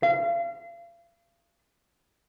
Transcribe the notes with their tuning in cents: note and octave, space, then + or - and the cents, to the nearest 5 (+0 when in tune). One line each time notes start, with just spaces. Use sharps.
F5 -35